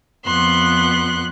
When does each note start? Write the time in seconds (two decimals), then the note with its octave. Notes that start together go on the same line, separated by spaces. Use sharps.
0.25 F2 B3 C6 F#6